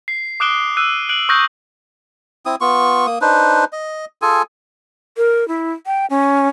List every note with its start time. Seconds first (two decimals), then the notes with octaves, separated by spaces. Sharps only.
0.08 C7
0.40 D6 D#6 F#6 D7 E7 G7
0.77 E6 F#6 D#7
1.09 F#6 D7 F#7
1.29 C#6 D#6 E6 F#6 G6 A#6
2.46 C4 E4 D#6
2.61 B3 F4 C#6
3.07 A#3 D#6
3.21 D4 D#4 B4 C5
3.72 D#5
4.22 F4 G#4 A4 G#5
5.17 A#4
5.48 E4
5.86 G5
6.10 C#4